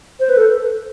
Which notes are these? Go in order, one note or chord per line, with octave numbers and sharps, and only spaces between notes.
C5
B4
A4